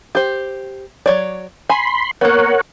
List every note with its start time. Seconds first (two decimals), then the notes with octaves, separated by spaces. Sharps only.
0.15 G4 C5
1.06 F#3 C#5 D5
1.70 G#5 B5 C6
2.21 A#3 B3 A#4 C#5 F#5